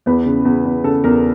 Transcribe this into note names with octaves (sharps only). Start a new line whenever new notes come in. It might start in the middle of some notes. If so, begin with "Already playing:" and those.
E2 B3 B4
C#3
E2
E2
C#3 A4
E2 A#4